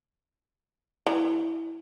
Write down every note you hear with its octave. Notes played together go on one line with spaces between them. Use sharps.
E3